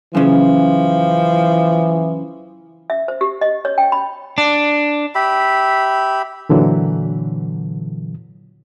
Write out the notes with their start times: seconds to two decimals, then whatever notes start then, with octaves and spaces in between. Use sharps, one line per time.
0.15 F#2 C#3 E3 F3
2.90 E5
3.08 C5
3.21 G4
3.41 D#5
3.65 C#5
3.78 G5
3.92 B5
4.38 D4
5.15 G4 E5 B5
6.49 A#2 D3 E3 F#3